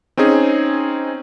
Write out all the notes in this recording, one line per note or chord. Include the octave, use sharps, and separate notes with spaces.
C4 C#4 D#4 G#4